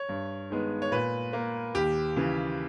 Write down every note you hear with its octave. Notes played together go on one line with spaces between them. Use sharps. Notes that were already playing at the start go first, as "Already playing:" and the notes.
Already playing: C#5
G2
D#3 G#3 B3
C#5
A#2 B4
A#3
D#2 G4
C#3 E3